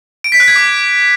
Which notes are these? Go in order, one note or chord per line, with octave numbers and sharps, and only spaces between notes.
D7
B6
F#6
G#6
D6